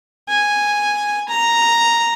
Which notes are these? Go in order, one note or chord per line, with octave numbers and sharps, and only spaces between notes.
G#5
A#5